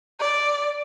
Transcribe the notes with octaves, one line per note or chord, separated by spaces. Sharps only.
D5